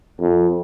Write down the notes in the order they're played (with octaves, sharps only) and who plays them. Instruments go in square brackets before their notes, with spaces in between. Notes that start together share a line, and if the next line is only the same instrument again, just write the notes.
[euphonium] F2